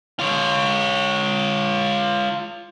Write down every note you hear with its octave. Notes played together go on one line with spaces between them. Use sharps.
F4 C#5